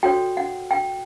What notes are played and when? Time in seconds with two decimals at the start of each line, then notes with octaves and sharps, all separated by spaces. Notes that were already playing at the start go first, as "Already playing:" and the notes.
0.03 F#4 A4 C#5 G5
0.37 F#5
0.71 G5